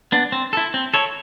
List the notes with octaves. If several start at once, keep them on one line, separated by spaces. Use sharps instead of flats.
B3 D4
C4
E4 A4
C4
E4 A4 C#5